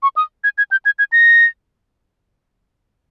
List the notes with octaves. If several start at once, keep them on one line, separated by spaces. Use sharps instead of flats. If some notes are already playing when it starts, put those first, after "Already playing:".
C#6
D#6
G#6
G#6
G6
G#6
G#6
A#6